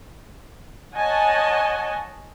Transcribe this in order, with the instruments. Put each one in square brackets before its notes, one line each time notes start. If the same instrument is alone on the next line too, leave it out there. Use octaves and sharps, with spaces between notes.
[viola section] C#5 D#5 F#5 G#5 A5